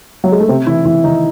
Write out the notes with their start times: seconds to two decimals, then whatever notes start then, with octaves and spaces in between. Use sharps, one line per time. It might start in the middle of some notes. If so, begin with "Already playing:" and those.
0.24 F#3
0.32 G#3
0.40 A3
0.48 C3 C4
0.67 E3 E4
0.85 E3 E4
1.04 D#3 D#4